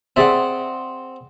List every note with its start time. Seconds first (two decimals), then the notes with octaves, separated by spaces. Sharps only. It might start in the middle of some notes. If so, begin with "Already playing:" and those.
0.16 C4 G#4 D5 E5 F#5